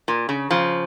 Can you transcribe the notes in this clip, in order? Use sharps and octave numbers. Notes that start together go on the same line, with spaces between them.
A#2
C#3
C#3 F3